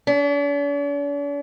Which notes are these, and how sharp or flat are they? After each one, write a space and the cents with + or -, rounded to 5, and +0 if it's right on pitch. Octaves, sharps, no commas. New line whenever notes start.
D4 -45